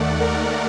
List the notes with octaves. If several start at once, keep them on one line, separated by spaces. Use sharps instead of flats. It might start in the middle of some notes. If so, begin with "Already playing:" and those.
Already playing: D#2 D#3 A3 D5 F#5
A#4